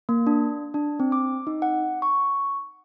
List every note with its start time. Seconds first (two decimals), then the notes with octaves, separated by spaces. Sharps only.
0.09 A#3
0.27 D4
0.74 D4
1.00 C4
1.12 D6
1.47 D#4
1.62 F#5
2.02 C#6